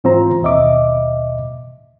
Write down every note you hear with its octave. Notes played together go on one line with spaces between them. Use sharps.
G#2 E3 C4 F4 C5 A#5
D#2 B2 D#5 E5 D6